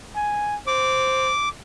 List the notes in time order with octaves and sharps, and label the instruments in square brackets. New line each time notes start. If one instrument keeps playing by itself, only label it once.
[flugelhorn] G#5
[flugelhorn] C5 [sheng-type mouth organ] D6